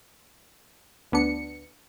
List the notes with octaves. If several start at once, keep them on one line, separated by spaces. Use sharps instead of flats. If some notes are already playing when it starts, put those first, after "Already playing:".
D2 B3 D4 C#7